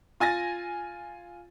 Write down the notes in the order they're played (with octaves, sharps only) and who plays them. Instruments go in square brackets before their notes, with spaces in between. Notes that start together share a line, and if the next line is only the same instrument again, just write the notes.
[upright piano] F4 G#5 A6 A#6